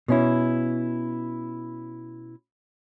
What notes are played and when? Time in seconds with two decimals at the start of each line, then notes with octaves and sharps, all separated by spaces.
0.08 B2 C#4 E4